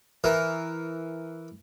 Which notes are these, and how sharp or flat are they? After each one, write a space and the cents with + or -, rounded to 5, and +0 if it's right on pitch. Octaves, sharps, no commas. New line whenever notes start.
E3 +0 A#4 +0